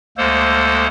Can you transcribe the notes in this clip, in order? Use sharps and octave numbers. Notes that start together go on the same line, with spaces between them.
D2 G#3 A#3 A4 C5